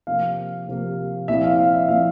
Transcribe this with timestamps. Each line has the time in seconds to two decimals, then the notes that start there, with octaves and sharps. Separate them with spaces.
0.07 C3 F3 A#3 F5
0.68 C3 F3 A#3
1.28 A#2 F3 C4 E4 E5
1.44 F5
1.59 F5
1.74 E5
1.89 A#2 F3 C4 E4 F5